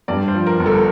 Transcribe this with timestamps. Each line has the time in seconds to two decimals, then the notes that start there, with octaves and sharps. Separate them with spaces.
0.08 G2 D5
0.28 C5
0.34 F3
0.46 A#4
0.60 G1
0.66 A4